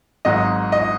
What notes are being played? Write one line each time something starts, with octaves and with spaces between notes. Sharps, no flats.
G#1 G#2 F#3 D#5
D#5